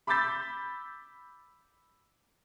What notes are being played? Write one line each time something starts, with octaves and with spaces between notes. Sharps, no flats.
B5 D6 E6 G6 A6 B6